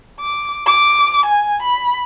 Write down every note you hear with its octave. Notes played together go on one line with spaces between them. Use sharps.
D6
D6
G#5
B5